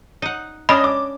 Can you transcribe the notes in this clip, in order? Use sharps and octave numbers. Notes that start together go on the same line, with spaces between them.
D#4 F#5
C#4 D4 D#5 B5 D#6
D6